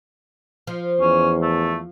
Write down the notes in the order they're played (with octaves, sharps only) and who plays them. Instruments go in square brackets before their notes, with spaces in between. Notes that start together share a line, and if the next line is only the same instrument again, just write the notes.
[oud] F3
[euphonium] E2 [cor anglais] C#4
[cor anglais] A3